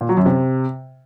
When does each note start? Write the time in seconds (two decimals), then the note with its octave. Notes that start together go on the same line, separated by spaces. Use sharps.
0.01 A#2
0.09 F#3
0.17 F#2
0.26 C3